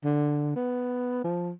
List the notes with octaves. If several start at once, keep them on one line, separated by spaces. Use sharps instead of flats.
D3
B3
F3